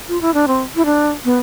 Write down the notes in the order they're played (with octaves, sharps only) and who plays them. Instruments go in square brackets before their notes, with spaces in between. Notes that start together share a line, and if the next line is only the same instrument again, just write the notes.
[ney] F4
E4
D4
C4
E4
D4
B3